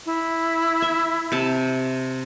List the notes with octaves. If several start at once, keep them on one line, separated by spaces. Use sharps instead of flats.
E4
E5
C3 A5